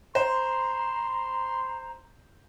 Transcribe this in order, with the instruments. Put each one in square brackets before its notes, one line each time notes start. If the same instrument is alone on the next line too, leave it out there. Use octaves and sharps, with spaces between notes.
[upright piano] C5 [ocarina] A#5 [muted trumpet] C6